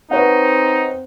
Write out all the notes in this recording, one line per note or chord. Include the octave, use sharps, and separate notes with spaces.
C4 D#4 B4 C#5 F#5